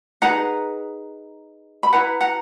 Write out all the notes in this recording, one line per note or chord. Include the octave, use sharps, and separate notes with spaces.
D#4 G#4 B4 F#5 A#5
B5
E4 B4 F#5 A#5
F#5 A#5